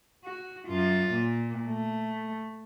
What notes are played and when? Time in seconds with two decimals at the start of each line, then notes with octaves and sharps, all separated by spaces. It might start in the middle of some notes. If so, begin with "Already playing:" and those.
0.24 F#4
0.68 F#2 F4
1.12 A#2
1.68 A3